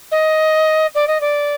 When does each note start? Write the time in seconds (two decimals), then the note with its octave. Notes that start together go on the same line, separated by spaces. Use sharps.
0.11 D#5
0.95 D5
1.07 D#5
1.21 D5